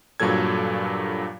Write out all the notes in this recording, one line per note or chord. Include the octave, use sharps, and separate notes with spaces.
G2 A#2 F#3 A4 G#6